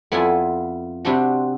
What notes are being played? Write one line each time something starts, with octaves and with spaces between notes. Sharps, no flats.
F2 B3 E4 F4 D5 G#5
C3 G3 C4 D4 F#4